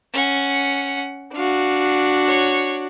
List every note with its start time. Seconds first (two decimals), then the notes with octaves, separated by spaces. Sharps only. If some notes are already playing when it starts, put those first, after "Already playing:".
0.13 C#4 F#5
1.34 D4 F#4 F5
2.26 C#5